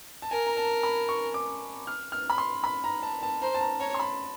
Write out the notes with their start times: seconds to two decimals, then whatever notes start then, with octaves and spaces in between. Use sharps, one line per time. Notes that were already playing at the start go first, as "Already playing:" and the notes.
0.22 A5
0.31 A#4 G#5
0.47 A#5
0.57 A5
0.83 B5
1.09 C#6
1.34 D6
1.87 F6
2.12 F6
2.30 B5
2.38 C6
2.64 B5
2.84 A#5
3.03 A5
3.23 A5
3.42 C5 A#5
3.54 A5
3.61 A#5
3.80 C#5 A#5
3.94 C6
3.99 B5